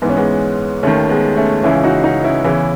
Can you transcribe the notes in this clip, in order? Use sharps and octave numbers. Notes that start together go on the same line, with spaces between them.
G#2 E3 B3
C#4
G#3 B3
D#2 D#3 A3 C#4
G#3 B3
A3 C#4
C#2 C#3 E3 C#4 E4
D#4 F#4
D#4 F#4
C#4 E4
E2 C#3 E3 C#4 E4